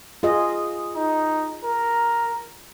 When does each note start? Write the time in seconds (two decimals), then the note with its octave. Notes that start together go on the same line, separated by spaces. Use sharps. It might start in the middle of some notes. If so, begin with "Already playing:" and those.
0.23 F4 G#4 D#5
0.96 D#4
1.63 A#4